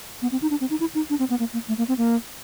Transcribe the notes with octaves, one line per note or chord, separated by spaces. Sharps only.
B3
C4
D#4
D4
C4
D#4
E4
D#4
D4
C4
B3
A#3
A#3
A3
A#3
C4
A#3